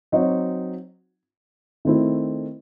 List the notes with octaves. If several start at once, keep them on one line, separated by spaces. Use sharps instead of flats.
F#3 C4 D#4 F#4 C#5
D#3 A3 C4 E4